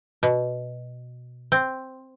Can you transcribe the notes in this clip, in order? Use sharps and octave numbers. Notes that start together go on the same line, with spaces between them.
B2
C4